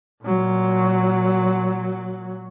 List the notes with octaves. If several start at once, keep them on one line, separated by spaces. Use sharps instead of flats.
A#2 F#3